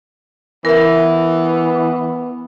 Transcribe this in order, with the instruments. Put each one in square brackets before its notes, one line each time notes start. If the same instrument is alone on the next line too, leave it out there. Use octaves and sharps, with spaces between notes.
[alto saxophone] E3 [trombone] B3 [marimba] A#4 E5